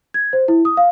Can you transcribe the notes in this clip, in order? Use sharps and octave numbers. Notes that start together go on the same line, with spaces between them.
G#6
C5
E4
D#6
F5